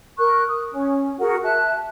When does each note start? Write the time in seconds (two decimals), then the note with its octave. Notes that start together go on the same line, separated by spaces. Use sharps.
0.18 A#4 C#6 F#6
0.47 D#6
0.72 C#4
1.19 F#4 G#4 A#4 F#5
1.43 E5 A5 F#6